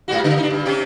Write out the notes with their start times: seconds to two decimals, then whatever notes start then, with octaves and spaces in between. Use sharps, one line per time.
0.08 G#2 G3 F#4
0.24 C#3
0.38 D4 D#4
0.50 G2
0.66 C3 C#4 G4